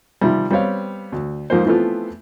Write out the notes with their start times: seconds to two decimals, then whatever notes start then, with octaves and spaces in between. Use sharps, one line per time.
0.21 C3 D#3 F3 G3
0.51 G3 B3 C4 C#5 F5
1.12 D2
1.50 F2 G#2 F3 A#3 C5
1.66 E3 F3 A3 B3 C4 F4